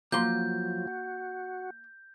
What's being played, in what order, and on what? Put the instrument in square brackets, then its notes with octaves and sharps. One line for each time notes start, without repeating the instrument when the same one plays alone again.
[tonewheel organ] F3 F#3 [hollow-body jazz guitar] A#3 C6 [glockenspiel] G6
[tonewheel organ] F#4